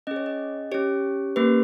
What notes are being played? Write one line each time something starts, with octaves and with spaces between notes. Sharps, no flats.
C#4 G#4 D#5
C#5
D#5
C#4 G4 C#5
A#3 C#4 G4 B4